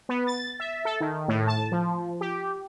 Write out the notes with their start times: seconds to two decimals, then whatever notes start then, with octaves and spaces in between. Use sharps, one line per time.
0.09 B3
0.27 A6
0.60 E5
0.85 A4
1.00 D#3
1.28 A2
1.47 A5
1.72 F3
2.21 G4